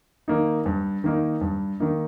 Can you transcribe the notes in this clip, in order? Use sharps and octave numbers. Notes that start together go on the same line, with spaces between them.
D#3 A#3 D#4
G2
D#3 A#3 D#4
G2
D#3 A#3 D#4